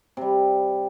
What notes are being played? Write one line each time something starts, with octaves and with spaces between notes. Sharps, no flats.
C3 G3